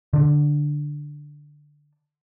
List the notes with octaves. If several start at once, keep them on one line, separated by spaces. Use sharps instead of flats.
D3 D4